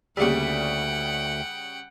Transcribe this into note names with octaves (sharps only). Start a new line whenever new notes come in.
D2 C#3 G3 A#3 G4 G#4 F#5 G5